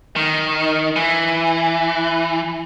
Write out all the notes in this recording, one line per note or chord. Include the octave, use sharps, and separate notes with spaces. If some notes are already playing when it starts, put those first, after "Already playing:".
D#3
E3